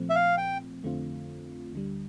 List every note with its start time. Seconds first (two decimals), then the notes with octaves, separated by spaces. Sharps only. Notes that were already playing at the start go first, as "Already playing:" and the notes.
Already playing: A#2 F3 A3 C4
0.10 E5
0.15 F5
0.37 G5
0.83 F2 D3 A3 C4 F4
1.73 D2 D3 G3